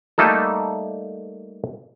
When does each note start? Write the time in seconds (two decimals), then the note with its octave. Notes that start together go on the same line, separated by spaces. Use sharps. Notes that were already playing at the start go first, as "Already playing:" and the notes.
0.18 G3 A3 A#3 D#4 A4